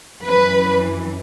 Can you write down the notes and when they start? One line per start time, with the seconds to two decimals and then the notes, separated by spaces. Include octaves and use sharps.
0.23 F#2 E3 B4